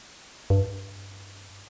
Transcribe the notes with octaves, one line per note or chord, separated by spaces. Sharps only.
G2